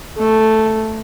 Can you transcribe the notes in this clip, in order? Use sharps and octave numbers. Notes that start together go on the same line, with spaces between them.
A3